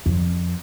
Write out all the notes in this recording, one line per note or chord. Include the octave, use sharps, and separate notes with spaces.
F2